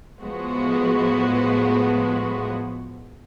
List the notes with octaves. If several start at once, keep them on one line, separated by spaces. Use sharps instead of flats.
A2 F3 G#3 B3 F#4